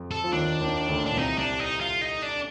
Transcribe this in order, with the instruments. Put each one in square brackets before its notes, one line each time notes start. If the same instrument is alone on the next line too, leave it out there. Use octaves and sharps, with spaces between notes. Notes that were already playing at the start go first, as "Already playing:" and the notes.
Already playing: [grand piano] F2 F3
[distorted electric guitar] A4
[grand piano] F3
[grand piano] D#2 D#3 [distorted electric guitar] D4
[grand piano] D#2 D#3
D2 D3
[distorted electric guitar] D4
[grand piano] A#2
[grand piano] C2 C3 [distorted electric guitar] D#4
[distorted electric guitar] D4
D#4
F4
D#4
D4